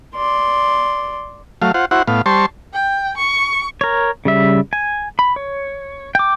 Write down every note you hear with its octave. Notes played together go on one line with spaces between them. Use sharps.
D5 C6
F#3 A3 F5
F4 C5 F#5
E4 F#4 C5 F#5
A2 B3 F5
G3 C5 A5 C6 C#6
G5
C#6
A#4 C#5
C#3 G3 E5
G#5
B5
C#5
G5 D6